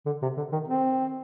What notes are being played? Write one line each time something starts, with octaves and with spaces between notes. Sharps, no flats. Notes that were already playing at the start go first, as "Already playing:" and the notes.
D3
C3
D3
D#3
C4